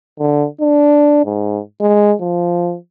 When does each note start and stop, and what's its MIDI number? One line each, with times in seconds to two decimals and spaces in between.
0.19 0.46 50
0.61 1.24 62
1.25 1.59 44
1.80 2.13 56
2.21 2.76 53